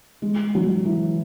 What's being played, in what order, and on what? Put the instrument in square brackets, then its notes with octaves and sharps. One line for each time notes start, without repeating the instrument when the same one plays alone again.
[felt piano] G#3
F#3
E3